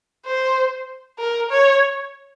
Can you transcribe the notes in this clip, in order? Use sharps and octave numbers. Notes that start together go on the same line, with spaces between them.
C5
A#4
C#5